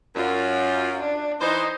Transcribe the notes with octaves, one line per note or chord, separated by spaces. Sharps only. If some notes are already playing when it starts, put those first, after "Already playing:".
F#2 F4
D4
E3 D#4 C5